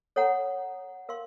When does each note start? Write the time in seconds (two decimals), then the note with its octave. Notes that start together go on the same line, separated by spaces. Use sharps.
0.16 A4 C#5 F#5 A#5
1.09 A#4 F5 C6